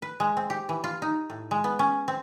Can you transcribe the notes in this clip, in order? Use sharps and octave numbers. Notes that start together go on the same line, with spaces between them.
B4
G#3
C4
G4
E3
F4
D#4
A2
G#3
B3
C#4
C4